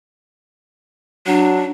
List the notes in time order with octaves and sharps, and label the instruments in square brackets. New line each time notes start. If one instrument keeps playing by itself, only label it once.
[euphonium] F#3 [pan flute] D4